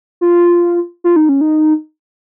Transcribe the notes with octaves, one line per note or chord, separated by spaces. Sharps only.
F4
F4
D#4
C#4
D#4